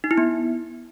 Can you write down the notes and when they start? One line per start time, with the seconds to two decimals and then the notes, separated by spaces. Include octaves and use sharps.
0.04 D#4
0.11 E4
0.18 B3